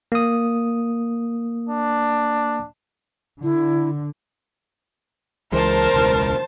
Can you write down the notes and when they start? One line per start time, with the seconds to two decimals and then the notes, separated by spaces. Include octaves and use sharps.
0.12 A#3 D#6
1.69 D4
3.43 D3 E4
5.52 C#2 E3 G#3 A#4 C5 A5
5.94 E1 C#2 E3